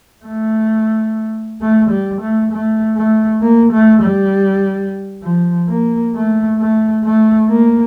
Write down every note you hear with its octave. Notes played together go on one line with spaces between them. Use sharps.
A3
A3
G3
A3
A3
A3
A#3
A3
G3
F3
A#3
A3
A3
A3
A#3